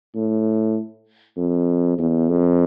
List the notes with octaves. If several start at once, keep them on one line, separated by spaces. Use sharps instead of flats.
A2
F2
E2
F2